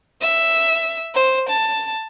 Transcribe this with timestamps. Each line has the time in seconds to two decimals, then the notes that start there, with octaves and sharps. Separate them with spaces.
0.21 E5
1.15 C5
1.49 A5